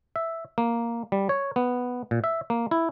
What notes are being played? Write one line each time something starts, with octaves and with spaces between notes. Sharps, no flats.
E5
A#3
G3
C#5
B3
A#2
E5
A#3
E4